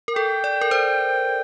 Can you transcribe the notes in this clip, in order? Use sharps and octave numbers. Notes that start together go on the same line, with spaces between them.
A#4
A4 G5
D5
A#4
C5